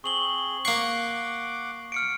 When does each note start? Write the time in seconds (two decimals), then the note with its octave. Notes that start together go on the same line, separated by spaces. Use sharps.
0.04 C4 G#4 C#6 F#7 G7
0.65 A#3 F#5 C#6 D6 C7
1.92 F6 C#7 D7